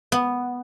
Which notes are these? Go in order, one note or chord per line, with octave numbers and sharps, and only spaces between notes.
B3